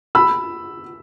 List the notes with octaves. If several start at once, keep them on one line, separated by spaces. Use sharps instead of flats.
B5 E6